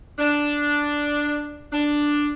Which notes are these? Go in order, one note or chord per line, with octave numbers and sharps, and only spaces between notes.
D4
D4